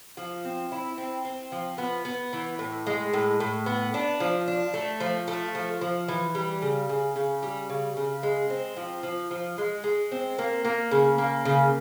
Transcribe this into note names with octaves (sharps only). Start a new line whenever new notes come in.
F3
C4
E4
C4
C4
F3
B3
B3
E3
A2
G#3
A2
A2
B3
D4
F3
D4
A3
F3
A3
F3
F3
E3
G3
C#3
C#3
C#3
G3
C#3
C#3
G#3
C4
F3
F3
F3
G#3
G#3
C4
A#3
A#3
C#3
A#3
C#3